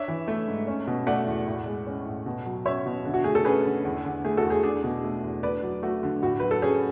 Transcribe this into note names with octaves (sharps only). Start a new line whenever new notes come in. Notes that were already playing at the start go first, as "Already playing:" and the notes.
Already playing: D4 C#5 E5
E3
A3
G#2
C#4
B2
A3 D5 F#5
E2
A2
G#3
C#4
A2
B2
F#3
C#4 C#5 E5
B2
D3
F#4
A3 G#4
A4
C#4 G#4 B4
D3
E2
D3
A3 G#4
F#4 A4
E2
G#4
D4 G#4
B2
A3
E2
D4 B4 D5
F#3
A3 F#4
D3
A2 F#4
F#3 B4
A4
C#4 G#4